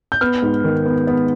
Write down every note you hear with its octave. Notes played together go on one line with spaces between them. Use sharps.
G6
B3 F6
G#2
D#3
B3
B3